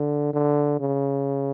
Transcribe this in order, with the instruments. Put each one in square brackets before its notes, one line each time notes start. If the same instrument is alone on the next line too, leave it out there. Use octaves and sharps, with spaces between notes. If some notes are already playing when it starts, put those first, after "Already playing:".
Already playing: [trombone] D3
D3
C#3